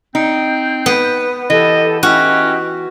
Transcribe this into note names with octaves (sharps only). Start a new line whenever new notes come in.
C4 D#4 G6
B3
E3 G4 A4 D#5
C#4 E4 F#4 G4 D#5